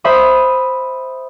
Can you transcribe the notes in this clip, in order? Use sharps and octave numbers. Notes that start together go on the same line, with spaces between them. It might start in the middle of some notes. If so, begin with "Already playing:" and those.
C5 E5 B5 D#6